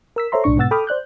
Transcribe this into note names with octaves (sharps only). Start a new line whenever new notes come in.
A#4 E6 B6
A4 C5 C#5 E5 A#5 C6
B1 A2 D4 C#6
G#2 B2 B3 F#5 E6 A6
A4 G5 B5 D6 D#6 F6
C5 D5 F#6 G6